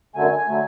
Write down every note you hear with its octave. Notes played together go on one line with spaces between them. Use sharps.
F#2 D3 F#3 A3 G#5
D3 F#3 A3